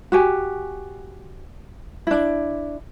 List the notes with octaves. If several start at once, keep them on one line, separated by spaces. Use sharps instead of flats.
F#4 G4 G#5
D4 E4